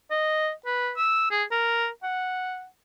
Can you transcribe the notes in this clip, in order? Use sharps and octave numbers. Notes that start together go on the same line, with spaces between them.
D#5
B4
E6
G#4
A#4
F#5